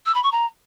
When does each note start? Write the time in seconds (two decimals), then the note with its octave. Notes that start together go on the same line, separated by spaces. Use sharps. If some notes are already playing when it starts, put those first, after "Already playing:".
0.06 E6
0.15 B5
0.23 C#6
0.32 A#5